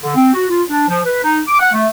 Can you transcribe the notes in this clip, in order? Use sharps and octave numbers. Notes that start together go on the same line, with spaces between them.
D3
C4
F#4
F4
D4
F3
B4
D#4
D6
F#5
A3